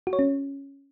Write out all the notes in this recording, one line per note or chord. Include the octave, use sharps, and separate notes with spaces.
F#4
C#5
C#4